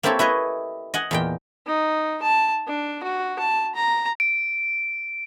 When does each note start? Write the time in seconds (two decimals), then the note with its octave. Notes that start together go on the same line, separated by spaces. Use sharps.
0.03 A#3 C4 E4 G4 A4 C#5
0.19 E4 B4 C#5 D#5
0.94 D#5 F#5 G#5
1.11 E2 A#2 G5
1.67 D#4
2.22 A5
2.67 D4
3.03 F#4
3.39 A5
3.75 A#5
4.20 D7